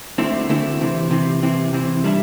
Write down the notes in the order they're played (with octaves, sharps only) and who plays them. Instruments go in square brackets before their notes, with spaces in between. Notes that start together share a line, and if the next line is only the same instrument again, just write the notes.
[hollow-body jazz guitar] D2 D3 A3 C4 E4
D2 D3 A3 C4 E4
C3 E3 C4
C3 E3 C4
C3 E3 C4
C3 E3 C4
G3 D4 A4 E5